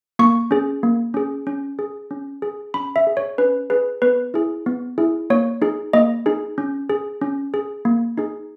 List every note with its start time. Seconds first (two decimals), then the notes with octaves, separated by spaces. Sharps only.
0.19 A#3 C#6
0.51 C#4 G#4
0.83 A#3
1.14 C#4 G#4
1.47 C#4
1.79 G#4
2.11 C#4
2.42 G#4
2.74 C#4 B5
2.96 E5
3.07 G#4
3.17 C#5
3.38 C#4 B4
3.70 G#4 B4
4.02 B3 B4
4.34 E4 G#4
4.66 B3
4.98 E4 G#4
5.30 A#3 C#5
5.62 D#4 G#4
5.93 A#3 D#5
6.26 D#4 G#4
6.58 C#4
6.90 G#4
7.21 C#4
7.54 G#4
7.85 A#3
8.18 D#4 G#4